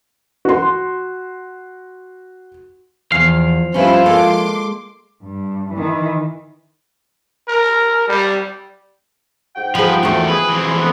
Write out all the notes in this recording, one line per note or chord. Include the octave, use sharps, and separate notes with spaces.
F#4 C6
E2 F3 F5
G2 C#4 E4 F4 B4 C5
G#3 A#3 A4 C6 D6
G2
D#3 E3
A#4
G3
G#2 F#5 G5
F3 F4 G#4 B4
E2 A3 F4 F#4
G#4 B4
E3 C4
D2 B3